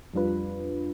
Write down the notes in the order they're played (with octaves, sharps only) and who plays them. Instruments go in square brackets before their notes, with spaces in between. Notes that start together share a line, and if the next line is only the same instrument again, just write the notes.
[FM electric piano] F2 G3 D4 F4 B4